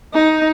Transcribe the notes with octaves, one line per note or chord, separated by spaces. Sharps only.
D#4